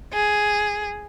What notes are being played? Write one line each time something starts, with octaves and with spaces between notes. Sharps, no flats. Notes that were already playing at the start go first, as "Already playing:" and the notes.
G#4